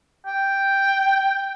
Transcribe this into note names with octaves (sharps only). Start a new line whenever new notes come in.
G5